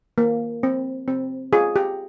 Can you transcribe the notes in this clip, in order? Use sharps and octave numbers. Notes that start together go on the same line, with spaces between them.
A#3
C4
C4
F4 G#4
G4